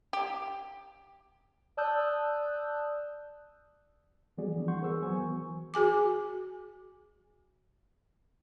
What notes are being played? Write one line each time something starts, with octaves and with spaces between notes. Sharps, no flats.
G4
D5 A5 D#6 E6 F#6 G6
E3 G3 B3 F#4 G#4 D5
E3 F3 D4
F#5 C6 C#6 G6
B3 G#4 A#4 C5 C#6 E6
F#3 B3 F#4 G#5 C#6
E3
F#4 G#4 G#5 D6